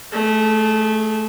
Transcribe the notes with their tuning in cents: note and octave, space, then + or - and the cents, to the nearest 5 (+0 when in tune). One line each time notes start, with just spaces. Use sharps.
A3 -15 G#4 +10